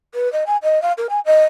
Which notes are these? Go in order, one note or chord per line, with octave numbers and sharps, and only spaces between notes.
B4
D#5
G#5
D#5
F5
A#4
G#5
D#5